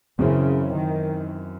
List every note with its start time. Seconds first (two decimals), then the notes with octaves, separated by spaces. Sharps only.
0.19 F#2 C#3 E3 C4 E4
0.75 D#3